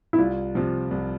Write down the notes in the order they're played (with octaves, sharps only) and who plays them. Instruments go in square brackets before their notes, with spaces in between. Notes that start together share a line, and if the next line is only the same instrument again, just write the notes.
[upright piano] E4
[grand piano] C2 [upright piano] F4
[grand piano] C3 F3
C2